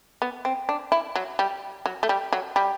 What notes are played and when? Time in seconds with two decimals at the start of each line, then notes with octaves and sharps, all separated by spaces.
0.22 B3
0.45 C4
0.69 D4
0.92 E4
1.16 F#3
1.39 G3
1.86 F#3
2.03 A3
2.09 G3
2.33 F#3
2.56 G3